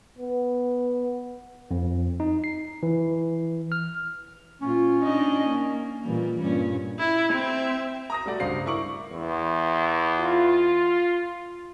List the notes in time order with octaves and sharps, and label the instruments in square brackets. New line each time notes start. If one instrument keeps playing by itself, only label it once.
[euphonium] B3
[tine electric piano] F2
D#4
C7
E3
F6
[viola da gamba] A#2 F4 [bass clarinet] C#4
[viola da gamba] D4 D#4 D#5
A#3
[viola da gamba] A#2 G3 A#3 [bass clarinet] E3
[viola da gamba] G2 A#2 C#4 [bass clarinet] G3
[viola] E4
C4 E5
[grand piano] A#5 D#6 A#6
G3 A3 F#4 D5
C#2 G2 C5 F5 C7
E4 A#4 C#6 D6 F#7
[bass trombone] E2
[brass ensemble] F4